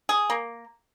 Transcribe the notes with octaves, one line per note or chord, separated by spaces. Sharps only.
G#4
A#3